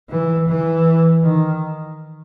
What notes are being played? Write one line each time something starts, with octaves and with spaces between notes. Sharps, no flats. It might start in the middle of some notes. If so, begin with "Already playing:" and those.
E3
E3
D#3